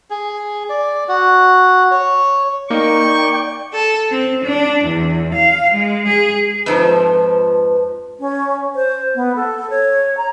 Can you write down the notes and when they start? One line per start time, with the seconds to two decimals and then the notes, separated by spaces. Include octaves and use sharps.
0.10 G#4
0.70 D5
1.08 F#4
1.91 C#5
2.70 A#3 D#4 D5 G5 C#6
3.73 A4
4.11 C4
4.43 D4
4.84 E2
5.33 F5
5.73 G#3
6.07 G#4
6.66 F2 G#2 F3 B4
8.19 C#4
8.75 C5
9.15 B3
9.36 A4
9.70 C#5
10.17 A#5